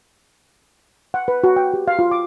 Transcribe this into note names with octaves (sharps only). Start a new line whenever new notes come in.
F#5
B4
F#4
G5
G4
F5
F4
D6